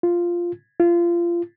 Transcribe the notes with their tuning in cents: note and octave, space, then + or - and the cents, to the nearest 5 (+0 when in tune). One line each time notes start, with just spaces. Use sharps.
F4 -5
F4 -25